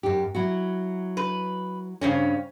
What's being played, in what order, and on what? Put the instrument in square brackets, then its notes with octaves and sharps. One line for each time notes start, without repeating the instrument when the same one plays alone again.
[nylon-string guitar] F#2 G4
F#3 E4 F#4
[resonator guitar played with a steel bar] B4
[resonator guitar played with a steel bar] G2 C#3 C#4 [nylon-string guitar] C5 F5